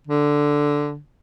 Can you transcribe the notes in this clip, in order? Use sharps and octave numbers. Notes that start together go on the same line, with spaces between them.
D3